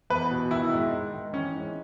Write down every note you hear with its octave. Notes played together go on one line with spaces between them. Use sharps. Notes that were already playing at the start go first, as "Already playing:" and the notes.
E2 B4
B2
D#3 E4
G#2
G#2
D#3
E3 C#4
G#2